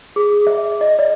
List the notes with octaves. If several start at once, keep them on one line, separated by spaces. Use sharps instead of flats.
G#4
E5
D#5
D5